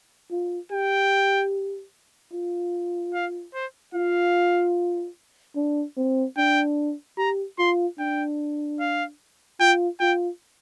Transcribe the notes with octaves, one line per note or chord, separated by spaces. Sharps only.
F4
G4 G5
F4
F5
C5
F4 F5
D4
C4
D4 G5
G4 A#5
F4 C6
D4 G5
F5
F4 G5
F4 G5